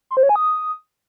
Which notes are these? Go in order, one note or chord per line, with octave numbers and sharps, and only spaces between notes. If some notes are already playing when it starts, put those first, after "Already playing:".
C6
C5
C#5
G#5
D#6